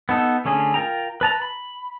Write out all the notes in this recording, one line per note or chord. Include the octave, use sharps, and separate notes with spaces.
B3 D#4 A4
D3 A3 C#4 G#4
F4 A#4 G5 A#5
B4 A5 A#5
B5